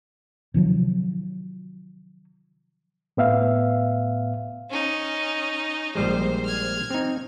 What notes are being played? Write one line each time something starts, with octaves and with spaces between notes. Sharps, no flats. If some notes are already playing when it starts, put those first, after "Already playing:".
C3 D#3 F3 F#3
A2 B3 E5 F5
C#4 D#4
A#1 G3 G#3 C5
F6 G#6
C4 D#4